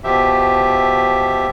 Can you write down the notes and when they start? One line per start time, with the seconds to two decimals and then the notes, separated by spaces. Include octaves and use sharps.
0.04 B2 F3 G4 E5